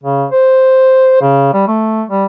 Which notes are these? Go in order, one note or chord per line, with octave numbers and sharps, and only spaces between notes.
C#3
C5
C#3
G3
A3
G3